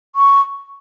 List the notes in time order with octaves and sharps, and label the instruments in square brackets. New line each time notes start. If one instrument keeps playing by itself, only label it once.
[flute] C#6